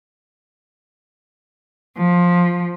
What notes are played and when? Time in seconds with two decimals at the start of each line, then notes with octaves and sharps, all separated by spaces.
1.97 F3